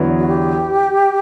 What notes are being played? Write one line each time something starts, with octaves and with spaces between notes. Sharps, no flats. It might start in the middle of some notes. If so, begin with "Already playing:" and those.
Already playing: E2 D3 F#3 B3 E4
F#4
G4